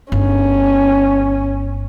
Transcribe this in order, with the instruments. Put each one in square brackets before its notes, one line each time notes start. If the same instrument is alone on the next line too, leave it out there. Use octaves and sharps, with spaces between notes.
[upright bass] G1 [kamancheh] C#4